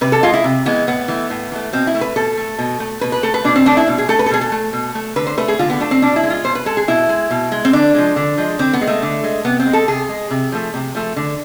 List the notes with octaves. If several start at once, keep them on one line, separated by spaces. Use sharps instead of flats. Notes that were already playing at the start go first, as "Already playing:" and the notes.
C3 B4
A4
E3 G#3 F4
E4
C3
E3 G#3 B3
A2 B3
E3 A3
A2
E3 A3
B2 C4
E4
A3
B4
B2 A4
A3
B2
A3
B2 B4
B4
A3 A4
B4
B2 D4
C4
A3 D4
E4
B2
G#4
A3 A4
B4
A4
B2 G#4
A4
A3
B2
A3
D3 B4
C5
A3 B4
G#4
D3 F4
B3
A3 D4
C4
B2 D4
E4
G#3
F4
B2 C5
B4
G#3 A4
G#4
B2 E4
G#3
B2
G#3
C4
D3 D4
F3 G#3
D3
F3 G#3
D3 C4
B3
G#3
A3
D3
G#3
C3 B3
C4
G#3
A4
C3 G#4
G#3
C3
F3 A3
C3
F3 A3
D3